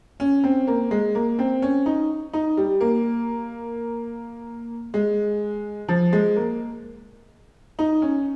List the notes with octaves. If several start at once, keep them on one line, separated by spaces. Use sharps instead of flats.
C#4
C4
A#3
G#3
A#3
C4
C#4
D#4
D#4
G3
A#3
G#3
F3
G#3
A#3
D#4
C#4